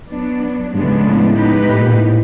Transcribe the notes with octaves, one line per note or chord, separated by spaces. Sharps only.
F#3 B3 D4
G2 C#3 F3 G#3 B3 D4
A2
G#2
A2
G#3 B3 D#4 G4 B4
A2
A#2
A2